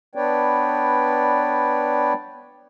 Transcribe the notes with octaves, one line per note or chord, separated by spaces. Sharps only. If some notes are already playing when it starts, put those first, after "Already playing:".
B3 D4 B4 C#5 D5 G5